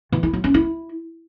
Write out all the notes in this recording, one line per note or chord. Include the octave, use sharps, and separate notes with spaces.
E3
E4
F#3
C#4
E4